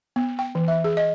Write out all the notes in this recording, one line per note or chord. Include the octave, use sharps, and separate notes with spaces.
B3
G5
E3
E5
G#4
D#5